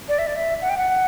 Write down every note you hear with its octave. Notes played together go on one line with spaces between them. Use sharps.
D5
E5
D5
E5
F#5
G5
F#5